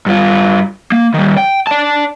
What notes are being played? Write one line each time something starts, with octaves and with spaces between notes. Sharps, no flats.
G2 F4
A#3
D#3 G3
G5
D5 A5